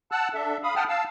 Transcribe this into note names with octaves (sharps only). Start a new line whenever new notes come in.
F#5 A5 E6 F#6
D4 A4 E5
F5 B5 D#6
F#5 G5 A5 D#6 F6
F5 A5 E6